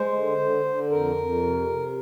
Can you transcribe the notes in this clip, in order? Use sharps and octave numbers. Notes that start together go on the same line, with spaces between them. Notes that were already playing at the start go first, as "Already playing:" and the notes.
Already playing: G#3 C5
D3
D3
D3
F2 A#4
F2
C3
C3